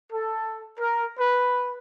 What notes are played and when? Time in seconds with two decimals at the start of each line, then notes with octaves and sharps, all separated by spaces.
0.11 A4
0.79 A#4
1.19 B4